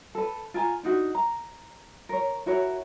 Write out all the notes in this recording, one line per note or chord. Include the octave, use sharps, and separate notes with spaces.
A4 B4
F4 G#5 A#5
D4 D#4 F#4
A#5
A#4 C#5
E4 F#4 A#4 C#5